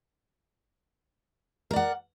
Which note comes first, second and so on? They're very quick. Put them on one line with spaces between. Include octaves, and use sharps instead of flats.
A#4 D5 F#5